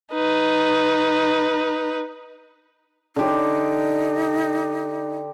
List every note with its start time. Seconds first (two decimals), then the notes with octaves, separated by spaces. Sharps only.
0.13 D#4 B4
3.16 D3 D#4 G4